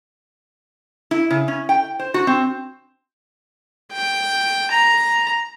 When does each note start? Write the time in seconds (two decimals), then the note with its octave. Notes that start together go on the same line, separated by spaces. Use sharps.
1.11 E4
1.30 C#3
1.48 C#4
1.69 G5
2.00 C5
2.14 F#4
2.27 C4
3.92 G5
4.71 A#5